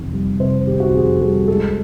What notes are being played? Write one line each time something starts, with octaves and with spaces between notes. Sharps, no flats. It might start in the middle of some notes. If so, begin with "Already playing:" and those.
Already playing: F2 C3 D#3
G3
C3 C5
D#3 G4
F#4
F2 G#4
G3 A4
G#3 A4